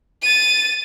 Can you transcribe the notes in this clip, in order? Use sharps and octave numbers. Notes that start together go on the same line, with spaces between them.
A6 D#7